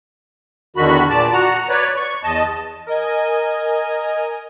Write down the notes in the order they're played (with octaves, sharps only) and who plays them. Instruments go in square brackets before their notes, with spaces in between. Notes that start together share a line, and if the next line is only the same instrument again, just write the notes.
[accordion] E2 D3 D#3 F#4 B5
A#2 D5 A5
F#4 F#5 A#5
B4 C#5 D5
C#6
E2 D#5 A5
[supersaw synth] A#4 D#5 G#5